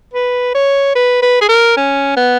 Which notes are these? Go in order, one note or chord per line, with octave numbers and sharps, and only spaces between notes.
B4
C#5
B4
B4
G#4
A#4
C#4
B3